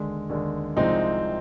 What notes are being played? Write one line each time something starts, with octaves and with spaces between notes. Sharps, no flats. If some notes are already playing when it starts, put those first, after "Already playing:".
Already playing: D#2 D3 G#3
D#2 D3 G#3
C2 C3 F3 G#3 C4 D#4